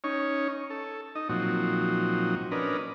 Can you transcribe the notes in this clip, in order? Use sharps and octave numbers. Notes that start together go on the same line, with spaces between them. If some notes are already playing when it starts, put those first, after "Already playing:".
C#4 D#4 C#5
A4
D#4 D#5
A#2 F3 F#3 C4 D#4 F#4
C#4 D4 A#4 B4 D#5